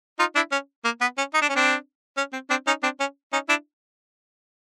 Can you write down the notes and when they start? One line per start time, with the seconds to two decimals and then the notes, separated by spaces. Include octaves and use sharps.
0.19 D#4 F4
0.35 D4 E4
0.52 C#4
0.85 A#3
1.01 B3
1.18 C#4
1.34 D#4
1.42 D4
1.49 C#4
1.56 C4 D4
2.17 C#4
2.33 C4
2.50 C4 D4
2.67 C#4 D#4
2.83 C4 D4
3.00 C#4
3.32 C#4 D#4
3.49 D4 E4